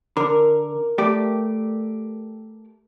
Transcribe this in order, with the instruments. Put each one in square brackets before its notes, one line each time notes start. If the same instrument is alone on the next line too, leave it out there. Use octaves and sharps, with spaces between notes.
[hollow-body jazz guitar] D3 [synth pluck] A#4
[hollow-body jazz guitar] A3 G4 D5